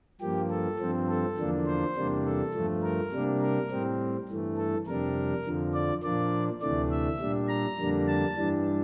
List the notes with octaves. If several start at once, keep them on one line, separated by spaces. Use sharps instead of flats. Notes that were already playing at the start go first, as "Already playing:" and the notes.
G2 F3 A#3 G4
A4
G2 F3 C4
A4
E2 D3 F3 A#3 D4
C5
E2 C3 G3 A#3 D4
A4
G2 F3 A3
A#4
C3 G3 A#3 D4
A#4
A2 G3 C4
G2 E3 A3
A4
F2 C3 G3 D4 A#4
F2 D3 F3
D5
A#2 F3 A#3 D4 D5
D2 C3 E3 A3 D4 D5
E5
A#2 G3 D4
A#5
F2 D3 G3 A#3 D4
A5
G2 E3 G3 D4